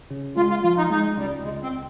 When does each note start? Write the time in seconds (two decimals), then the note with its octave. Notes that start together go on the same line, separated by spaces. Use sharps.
0.10 C#3
0.36 G#3 F4
0.50 F4
0.63 F3 F4
0.78 D#4
0.90 G#3 D#4
1.17 C#2 G3
1.44 C#2 G#3
1.63 C4